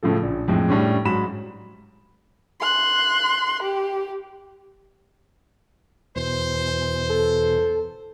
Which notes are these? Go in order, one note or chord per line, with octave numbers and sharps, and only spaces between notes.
A2 C#3 F3 A4
A#1
F2 A2 G#3
A2 G3 C#4 D4
G#2 F#3 B5 E7
C6 F#6
G4
E2 B2 E3 C5
A4